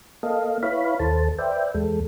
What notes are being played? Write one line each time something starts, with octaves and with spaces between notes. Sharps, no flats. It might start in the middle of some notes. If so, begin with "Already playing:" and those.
A#3 A4 D#5 F5
E4 B4 C#5 F5 B5
D#2 A4 C5 A5
B4 C5 D5 E5 G5
E2 G#3 A4